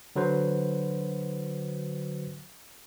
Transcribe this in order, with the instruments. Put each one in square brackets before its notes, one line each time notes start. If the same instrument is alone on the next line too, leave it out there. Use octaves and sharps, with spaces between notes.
[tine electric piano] D3 F#3 F#4 B4 C5